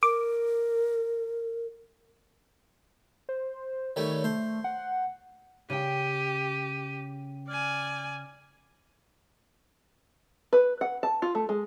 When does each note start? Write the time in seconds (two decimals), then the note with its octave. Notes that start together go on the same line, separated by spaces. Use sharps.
0.03 A#4 D6
3.29 C5
3.96 D#3 G3 A3 C#5
4.24 A3 C5
4.64 F#5
5.70 C#3 G4 G5 D#7
7.48 D5 G#5 F6
10.53 B4
10.81 F#5
11.03 A5
11.22 F4
11.35 A3
11.49 G#3